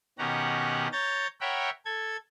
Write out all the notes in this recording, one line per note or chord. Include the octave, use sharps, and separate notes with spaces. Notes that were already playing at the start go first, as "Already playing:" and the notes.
B2 D#3 C#4 G4 F#5 A#5
C#5 A#5 G6 A6
A#4 C#5 E5 F#5 G5 B5
A4 G#6